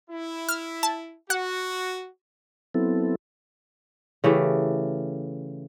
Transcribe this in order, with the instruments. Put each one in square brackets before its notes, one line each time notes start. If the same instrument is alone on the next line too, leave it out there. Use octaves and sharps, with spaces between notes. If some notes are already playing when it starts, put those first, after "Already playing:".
[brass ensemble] E4
[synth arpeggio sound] F6
A5
[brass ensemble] F#4 [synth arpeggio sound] F#5
[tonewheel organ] F#3 B3 C4 E4 A4
[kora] C#3 E3 A3 G4